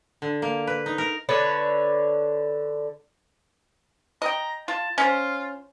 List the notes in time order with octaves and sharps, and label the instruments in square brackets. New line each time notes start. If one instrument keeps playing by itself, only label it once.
[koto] D3
A#3
B4
D#4
A#4
[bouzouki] D3 B4 C#5 D5
[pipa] D#5 G5 [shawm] A#5
[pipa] F4 [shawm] A5
[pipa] C#4 C5 [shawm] F4